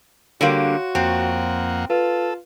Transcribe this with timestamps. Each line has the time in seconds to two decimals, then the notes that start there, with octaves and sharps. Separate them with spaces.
0.41 D3 G3 A#3 F#4 C#5 F5 C6
0.95 F2 A#3 C4 F#5
1.90 F4 A4 B4